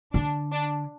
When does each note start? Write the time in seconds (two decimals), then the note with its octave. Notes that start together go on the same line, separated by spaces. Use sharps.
0.14 D3 D4
0.52 D4